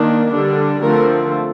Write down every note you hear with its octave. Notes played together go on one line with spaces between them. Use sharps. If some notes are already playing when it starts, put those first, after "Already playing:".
Already playing: D#3 A#3 D4
D3 G3 D4
D3 F3 A3 C4 A#4